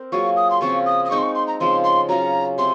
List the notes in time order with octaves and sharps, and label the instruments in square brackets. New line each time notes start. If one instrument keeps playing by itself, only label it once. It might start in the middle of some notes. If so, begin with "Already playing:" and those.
Already playing: [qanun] C4 A#4
[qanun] F#3 A#3 F4 G#4 [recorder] C#6
[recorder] D#6
C6
[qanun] C#3 F3 C4 F4 [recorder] C#6
[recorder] D#6
D#6
[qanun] G#3 C4 D#4 [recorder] C#6
[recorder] C6
C#6
C6
A#5
[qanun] C#3 F3 G#3 C4 [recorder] C6
[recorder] C6
[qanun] F#3 C#4 F4 G#4 [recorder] A#5
[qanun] C3 [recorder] C6